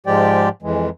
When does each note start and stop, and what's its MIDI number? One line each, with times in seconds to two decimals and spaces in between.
0.07 0.49 44
0.07 0.49 53
0.07 0.49 56
0.07 0.49 67
0.07 0.49 74
0.07 0.49 79
0.62 0.89 41
0.62 0.89 52
0.62 0.89 56